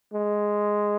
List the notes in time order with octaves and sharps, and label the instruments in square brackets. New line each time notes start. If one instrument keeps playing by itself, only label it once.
[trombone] G#3